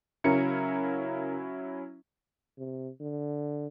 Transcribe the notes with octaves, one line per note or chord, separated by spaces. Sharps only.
C#3 F#3 C#4 E4 A#4 C#7
C3
D3